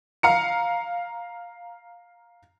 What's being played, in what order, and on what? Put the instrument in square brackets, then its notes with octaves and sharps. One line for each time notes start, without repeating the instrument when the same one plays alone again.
[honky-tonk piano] F5 A#5 C#7